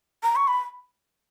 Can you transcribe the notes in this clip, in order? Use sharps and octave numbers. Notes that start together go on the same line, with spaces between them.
A#5
C#6
B5